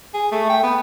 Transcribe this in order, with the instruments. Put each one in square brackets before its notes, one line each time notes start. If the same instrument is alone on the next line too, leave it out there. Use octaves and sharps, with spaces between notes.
[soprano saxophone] G#4
A3
G5
B3